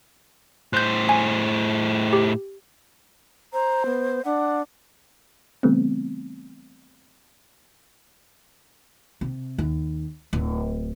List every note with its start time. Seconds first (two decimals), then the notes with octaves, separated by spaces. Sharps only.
0.73 A2 C5 F#6 G6
1.09 G#5
2.13 G4
3.53 C5 A#5
3.86 B3
4.25 D4 F#5
5.63 C#3 E3 G3 A3 B3 C4
9.21 C3
9.58 D#2
10.33 D1